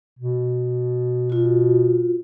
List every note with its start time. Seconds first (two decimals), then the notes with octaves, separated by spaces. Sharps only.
0.19 B2
1.30 F4 F#4